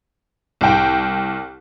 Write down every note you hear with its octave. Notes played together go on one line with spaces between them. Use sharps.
C2 G5